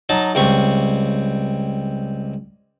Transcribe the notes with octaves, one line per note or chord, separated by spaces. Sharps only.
F#3 D#4 A5
C#2 G3 C4 C#6